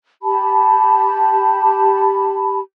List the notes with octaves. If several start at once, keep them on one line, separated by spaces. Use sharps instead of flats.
G4 A5 B5